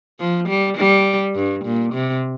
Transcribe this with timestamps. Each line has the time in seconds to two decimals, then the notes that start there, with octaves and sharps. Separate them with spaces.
0.20 F3
0.49 G3
0.77 G3
1.35 G2
1.65 A#2
1.93 C3